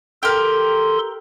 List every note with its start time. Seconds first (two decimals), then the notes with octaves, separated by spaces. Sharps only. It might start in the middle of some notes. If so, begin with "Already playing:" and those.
0.23 G4 A4 A#4 C6